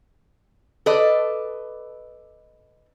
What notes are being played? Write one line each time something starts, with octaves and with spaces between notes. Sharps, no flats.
A4 B4 D5 D#5